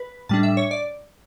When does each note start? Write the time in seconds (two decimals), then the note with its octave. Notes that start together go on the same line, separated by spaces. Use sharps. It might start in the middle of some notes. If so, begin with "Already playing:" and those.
Already playing: B4
0.29 A2 G3 D4 A5
0.43 E5
0.57 C#5
0.71 D5